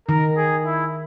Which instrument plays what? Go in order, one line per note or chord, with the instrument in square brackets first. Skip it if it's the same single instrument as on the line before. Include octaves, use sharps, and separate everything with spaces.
[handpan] D#3 [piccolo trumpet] A#4
[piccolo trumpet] G#4
E4